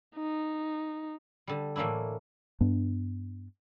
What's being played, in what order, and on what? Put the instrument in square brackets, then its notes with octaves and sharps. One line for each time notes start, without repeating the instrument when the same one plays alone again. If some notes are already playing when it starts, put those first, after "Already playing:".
[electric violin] D#4
[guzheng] D3 G3
A2 E3 A#3 D4 E4
[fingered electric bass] G2 B3 D4